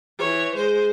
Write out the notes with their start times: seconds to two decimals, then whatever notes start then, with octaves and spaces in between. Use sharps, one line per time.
0.19 E3 C#5
0.55 G#3 C5